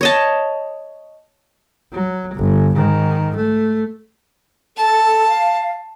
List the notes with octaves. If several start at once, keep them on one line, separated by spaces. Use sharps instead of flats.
C#5 D#5 A5
F#3
G1
G#2 D#3
A3
A4 A5
F5